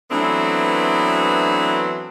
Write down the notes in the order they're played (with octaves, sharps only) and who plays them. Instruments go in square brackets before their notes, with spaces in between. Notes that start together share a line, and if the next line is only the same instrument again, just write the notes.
[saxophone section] E3 F#3 A3 B3 C4 D4